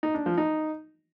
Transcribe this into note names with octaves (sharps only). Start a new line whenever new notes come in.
D#4
D4
F3
D#4